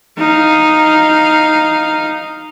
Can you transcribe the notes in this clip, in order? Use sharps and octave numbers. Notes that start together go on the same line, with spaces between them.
D#4 F5